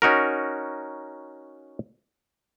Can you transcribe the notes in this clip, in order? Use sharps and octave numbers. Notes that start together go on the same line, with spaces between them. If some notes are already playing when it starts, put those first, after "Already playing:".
C#4 D#4 F#4 A#4